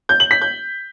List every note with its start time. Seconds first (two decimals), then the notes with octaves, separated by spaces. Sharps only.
0.09 G6
0.20 F#7
0.31 B6
0.42 G6